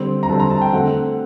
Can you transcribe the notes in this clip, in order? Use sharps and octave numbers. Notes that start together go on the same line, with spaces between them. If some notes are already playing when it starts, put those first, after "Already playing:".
Already playing: D3 G3 C4
A#5
D3 G3 C4 A5
A#5
A5
G5
D3 A3 C4 F#5